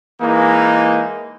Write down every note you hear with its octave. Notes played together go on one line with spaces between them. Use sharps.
E3 G#3 A#3 D#4